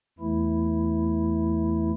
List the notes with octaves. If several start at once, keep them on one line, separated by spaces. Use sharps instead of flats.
E2 E3 A3 E4